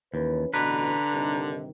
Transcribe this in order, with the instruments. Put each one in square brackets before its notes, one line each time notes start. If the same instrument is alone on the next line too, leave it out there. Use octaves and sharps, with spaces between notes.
[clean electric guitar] D#2 [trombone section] E3 C#4 B4
[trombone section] A1 B2 [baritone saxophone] D3 [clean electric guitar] B4 [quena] A#5
[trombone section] G2 C3 D#3